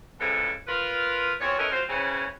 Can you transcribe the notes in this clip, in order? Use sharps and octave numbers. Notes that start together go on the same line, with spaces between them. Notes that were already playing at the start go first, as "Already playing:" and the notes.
A2 C#3 E3 F3 G#3 A4
F4 A#4 B4
E2 C4 F4 C#5
A3 C#4 E4 A#4 B4 D#5
C4 F4 F#4 C5
C#3 E3 C4 C#4